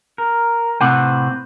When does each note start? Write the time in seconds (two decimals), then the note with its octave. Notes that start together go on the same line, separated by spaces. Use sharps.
0.18 A#4
0.81 A2 C3 C4 B4 C5 F#5